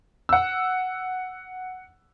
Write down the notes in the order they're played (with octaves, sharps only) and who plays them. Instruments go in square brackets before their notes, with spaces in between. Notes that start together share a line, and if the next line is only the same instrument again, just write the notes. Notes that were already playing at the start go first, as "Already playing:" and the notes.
[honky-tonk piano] F#5 E6